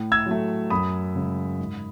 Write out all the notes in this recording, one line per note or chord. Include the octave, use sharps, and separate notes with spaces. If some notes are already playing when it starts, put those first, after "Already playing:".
Already playing: A2
E6 G#6
F#3 A3
F#2 B5 D#6
C#3 G#3
G#2